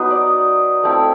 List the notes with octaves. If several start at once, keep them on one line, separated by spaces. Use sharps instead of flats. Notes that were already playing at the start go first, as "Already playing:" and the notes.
Already playing: F#3 B3 D#4
D5
A3 C4 E4